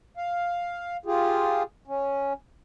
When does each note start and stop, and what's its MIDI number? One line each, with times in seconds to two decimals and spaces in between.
0.17 0.97 77
1.06 1.63 65
1.06 1.63 67
1.06 1.63 68
1.87 2.33 61